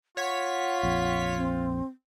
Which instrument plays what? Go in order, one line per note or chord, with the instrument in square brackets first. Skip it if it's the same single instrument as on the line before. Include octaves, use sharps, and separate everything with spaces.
[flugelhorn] F4 [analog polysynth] C#5 B6 [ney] F#5
[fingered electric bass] A#1 F2
[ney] C4